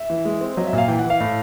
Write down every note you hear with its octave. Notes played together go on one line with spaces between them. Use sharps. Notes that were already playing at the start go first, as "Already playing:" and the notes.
Already playing: E5
E3
G#3
C4
F#3 D#5
E5
A#2
F5
E3 G5
F#5
E3
F5
A2